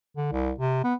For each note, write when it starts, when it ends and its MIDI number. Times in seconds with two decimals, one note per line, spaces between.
0.17 0.28 50
0.32 0.52 36
0.58 0.80 48
0.84 0.94 59